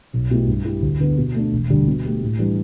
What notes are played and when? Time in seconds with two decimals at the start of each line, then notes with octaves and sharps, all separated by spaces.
0.13 B1
0.31 B2 A3 E4 G4
0.48 G2
0.65 G3 E4 G4
0.82 D2
1.00 D3 B3
1.18 B2
1.35 A3 D4
1.53 E1
1.70 D2 D3 G3 D4
1.87 B2
2.05 A3 G4
2.22 A2
2.39 E3 G3 D4